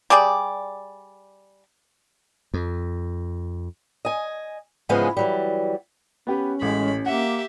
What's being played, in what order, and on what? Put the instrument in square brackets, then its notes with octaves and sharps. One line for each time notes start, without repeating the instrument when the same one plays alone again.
[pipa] G3 G4 G#4 D5
[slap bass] F2
[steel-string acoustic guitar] D#5 G#5
G#2 C#3 E3 F3 G#3 B3
E3 F#3 G3
[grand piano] B3 G4 B4 [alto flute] C#4
[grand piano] A1 A3 [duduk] G#3 [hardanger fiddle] B5
[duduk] A#3 [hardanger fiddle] G4 E5 [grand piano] F#5